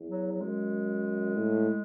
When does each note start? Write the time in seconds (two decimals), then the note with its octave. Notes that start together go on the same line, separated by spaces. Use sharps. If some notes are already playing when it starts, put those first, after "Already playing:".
Already playing: E2
0.10 F#3
0.32 F#3
0.41 F#2 G#3
1.35 A2